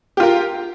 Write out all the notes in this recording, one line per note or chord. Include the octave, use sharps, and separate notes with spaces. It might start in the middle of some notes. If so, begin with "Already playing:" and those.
F4 G4 A#4